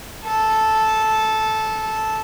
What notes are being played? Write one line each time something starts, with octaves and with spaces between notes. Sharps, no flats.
A4